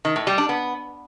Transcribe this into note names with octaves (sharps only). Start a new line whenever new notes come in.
D#3
A2
G3
D4
B3